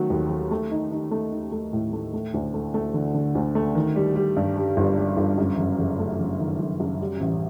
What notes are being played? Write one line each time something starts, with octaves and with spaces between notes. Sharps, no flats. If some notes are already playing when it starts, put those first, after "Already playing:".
Already playing: D#3 F#3 A3
D#2
F#3
A3
D#4
D#4
A3
D#4
A3
A2
A3
A3
D2
A3
A3
D3
D3
D2
A3
D#3
G3
G3
G2
G3
G1
G3
G1
F#2
F#1
F#1
A3
F#1
D#3
F#2
F#2
G3
A1